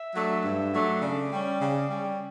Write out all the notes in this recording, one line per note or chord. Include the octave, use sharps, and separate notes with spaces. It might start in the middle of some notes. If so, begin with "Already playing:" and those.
Already playing: E5
F#3 A3 D4
G2
F#3 A3 D4
C#3 D5
G3 C#4
C#3
G3 C#4